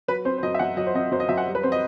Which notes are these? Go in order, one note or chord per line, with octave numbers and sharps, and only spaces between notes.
F#3 B4
C4 C5
C5
F#2 D#5
E5
F#2 F#5
F#3 D#5
C5
C4 D#5
F#2 C5
D#5
F#2 E5
F#5
G3
B4
C4 C5
D#5